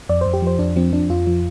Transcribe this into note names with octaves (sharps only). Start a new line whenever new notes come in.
F2 D5
F2 C5
G4
F3 C5
F2 D4
F3 C4
F3 D4
F2 F4
F3